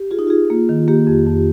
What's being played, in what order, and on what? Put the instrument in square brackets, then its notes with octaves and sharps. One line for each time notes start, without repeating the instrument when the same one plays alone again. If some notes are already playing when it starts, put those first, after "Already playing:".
Already playing: [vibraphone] G4
[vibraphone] F4 [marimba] G#4
[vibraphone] D#4
[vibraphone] F4 [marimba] G#4
[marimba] A#3
D#3
[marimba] A#3 [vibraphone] G4
[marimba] F2
F2